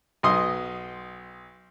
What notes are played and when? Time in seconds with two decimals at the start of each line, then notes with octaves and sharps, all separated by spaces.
0.23 B1 D#5 C6 D#6